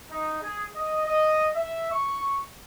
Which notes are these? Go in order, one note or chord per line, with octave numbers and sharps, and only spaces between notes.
D#4
G#4
D#5
D#5
E5
C#6